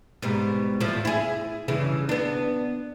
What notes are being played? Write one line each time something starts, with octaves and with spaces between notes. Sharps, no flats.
G#2 B2 G3
E2 A2 F3
E4 G#4
G2 C#3 E3
B3 D4